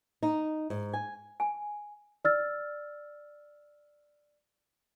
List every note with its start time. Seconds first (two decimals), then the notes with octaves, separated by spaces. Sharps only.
0.23 D#4
0.70 G#2
0.93 G#5
1.40 G#5
2.25 D5 E6 F6 A6